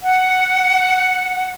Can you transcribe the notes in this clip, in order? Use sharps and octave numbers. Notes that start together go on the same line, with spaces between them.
F#5